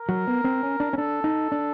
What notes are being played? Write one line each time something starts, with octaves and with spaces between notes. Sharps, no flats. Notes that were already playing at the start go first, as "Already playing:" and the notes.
Already playing: A#4
F#3
B3
C4
C#4
D4
C#4
D4 A4
D#4
D4